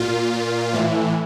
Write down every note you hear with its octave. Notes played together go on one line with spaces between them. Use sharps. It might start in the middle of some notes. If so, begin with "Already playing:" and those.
Already playing: A#2 F4
A#2
A2 E3